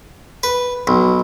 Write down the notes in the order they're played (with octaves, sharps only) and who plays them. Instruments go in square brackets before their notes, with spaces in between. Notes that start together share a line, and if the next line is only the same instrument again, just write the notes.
[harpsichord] B4
B1